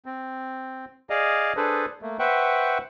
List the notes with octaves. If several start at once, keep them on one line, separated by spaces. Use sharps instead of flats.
C4
G#4 D5 D#5 F5
D4 G#4 A4 B4 C5
A3 A#3
B4 C5 E5 F#5 G5 C#6